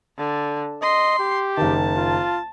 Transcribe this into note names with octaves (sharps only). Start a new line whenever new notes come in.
D3
D#5 C6
G4
F#1 D#3 A5
F4